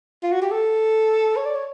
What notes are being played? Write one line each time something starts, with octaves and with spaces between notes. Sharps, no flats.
F4
F#4
G4
A4
C#5
D5
C#5